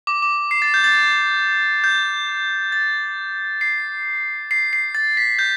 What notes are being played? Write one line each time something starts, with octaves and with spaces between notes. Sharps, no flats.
D6
D6
C7
A6
G6
A6
G6
A6
C7
C7
C7
A6
B6
G6